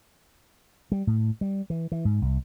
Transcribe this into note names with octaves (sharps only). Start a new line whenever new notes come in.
G3
A2
G3
E3
E3
G#2
C2